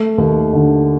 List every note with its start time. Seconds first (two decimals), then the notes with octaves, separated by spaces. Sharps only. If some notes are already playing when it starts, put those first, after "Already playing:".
Already playing: A3
0.18 D#2
0.53 D3